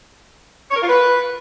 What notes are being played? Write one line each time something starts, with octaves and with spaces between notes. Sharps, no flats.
C#5
A#4
F4
B4